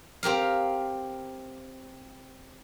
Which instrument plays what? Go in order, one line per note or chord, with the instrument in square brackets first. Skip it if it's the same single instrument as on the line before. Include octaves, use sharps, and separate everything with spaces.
[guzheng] C4 G4 A#4 F5